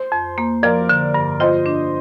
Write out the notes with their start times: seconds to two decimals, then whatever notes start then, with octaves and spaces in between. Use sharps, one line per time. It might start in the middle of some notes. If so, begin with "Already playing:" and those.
Already playing: C5
0.12 F2
0.38 A#3
0.63 F3 A#4 D5
0.89 D3
1.14 G2
1.40 F4 C5 D#5
1.66 D4